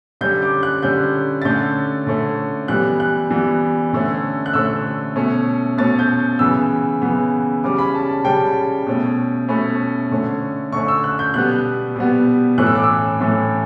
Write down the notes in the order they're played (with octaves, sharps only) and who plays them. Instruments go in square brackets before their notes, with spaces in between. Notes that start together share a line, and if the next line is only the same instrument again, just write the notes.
[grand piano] D3 G3 C#4 G6
D6
F#6
D3 G3 C#4 G6
A6
D3 A3 C#4 G6
D3 A3 C#4
E3 G3 B3 F#6
F#6
E3 G3 B3
D3 A3 C#4
F#6
D3 A3 C#4 E6
B2 A3 C#4
B2 A3 C#4 A6
G6
C#3 E3 B3 E6
C#3 E3 B3
C#3 G3 C#4 D6
B5
A5
A5
C#3 G3 C#4 G5
B2 A3 C#4
B2 A3 C#4 B5
D3 A3 C#4
D3 A3 C#4 C#6
E6
F#6
G6
B2 G3 B3 F#6
B2 G3 B3
A2 E3 A3 C#4 F#6
E6
D6
E6
A2 E3 A3 C#4